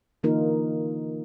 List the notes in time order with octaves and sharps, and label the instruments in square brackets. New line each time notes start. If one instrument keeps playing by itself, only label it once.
[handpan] D3 E3 A#3 D#4 F4 A#4